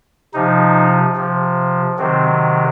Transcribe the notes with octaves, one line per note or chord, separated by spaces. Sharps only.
C3 F3 D#4
C3 F3
C3 D#3 F#3 C4